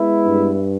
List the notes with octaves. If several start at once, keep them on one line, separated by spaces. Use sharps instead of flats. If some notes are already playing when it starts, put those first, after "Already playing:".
Already playing: G#3 B3 E4
G2